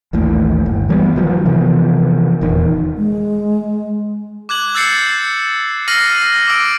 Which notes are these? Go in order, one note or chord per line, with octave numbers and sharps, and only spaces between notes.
A1 D#2 A2
G1
E3 G3 G#3 B3
D#3 F3 F#3
C3 E3 F3 B3
D#1 E2 D#3
G#3
D6 F#6 G#6 F#7
E6 G6 A6 C7 C#7
E6 F6 A#6 C7 D#7 F#7
D6 E6 D7